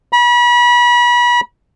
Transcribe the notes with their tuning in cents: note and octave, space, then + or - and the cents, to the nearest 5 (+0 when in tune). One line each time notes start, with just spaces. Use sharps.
B5 -35